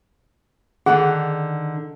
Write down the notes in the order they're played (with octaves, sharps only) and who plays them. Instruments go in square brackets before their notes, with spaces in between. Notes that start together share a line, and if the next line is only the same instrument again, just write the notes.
[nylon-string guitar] D3 D#3 D4 [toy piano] G#4 [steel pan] F#5